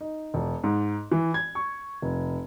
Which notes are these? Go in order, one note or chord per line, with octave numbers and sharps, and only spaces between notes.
D#4
E1
G#2
E3
G#6
C#6
F1